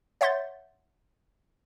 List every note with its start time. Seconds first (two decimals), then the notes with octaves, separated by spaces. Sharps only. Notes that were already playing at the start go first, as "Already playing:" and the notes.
0.21 C#5 E5 F#5 C6 G6 A6